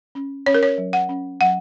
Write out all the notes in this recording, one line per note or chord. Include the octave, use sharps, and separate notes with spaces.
C#4
C#4 C#5
A#4
C#5
F#3
F#5
C#4
F#3 F#5